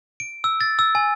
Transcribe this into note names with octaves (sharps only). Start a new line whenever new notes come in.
D7
E6
A6
E6
G#5